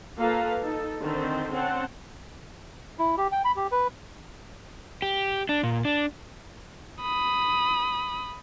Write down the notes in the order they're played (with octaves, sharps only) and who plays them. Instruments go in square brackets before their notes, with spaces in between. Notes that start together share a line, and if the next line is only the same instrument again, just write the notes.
[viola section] A#3 F4 A4 B4 F5 A#5
D#4 A4
D3 D#3 C4 A4 C5
C4 C#4 C5 F#5 A5
[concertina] E4
G4
G5
B5
G4
B4
[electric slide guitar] G4
D4
A#2
D4
[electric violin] B5 D#6